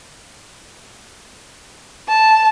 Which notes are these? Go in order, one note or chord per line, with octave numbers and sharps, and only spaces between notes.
A5